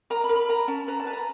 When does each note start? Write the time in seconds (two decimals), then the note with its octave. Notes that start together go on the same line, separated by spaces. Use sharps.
0.10 A#4 A#5
0.24 B5
0.29 A#4
0.36 B5
0.48 A#4 A#5
0.68 C#4 A5
0.88 B4 A#5
1.00 A5
1.07 B4
1.13 A#5